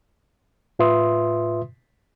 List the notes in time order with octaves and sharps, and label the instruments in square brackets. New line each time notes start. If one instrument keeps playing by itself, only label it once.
[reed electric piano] A2 F4 B4 E5 C6 D#6